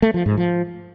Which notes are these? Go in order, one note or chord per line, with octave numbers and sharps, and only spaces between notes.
A3
F3
G#2
F3